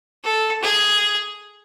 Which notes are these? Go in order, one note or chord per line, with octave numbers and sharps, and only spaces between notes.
A4
G#4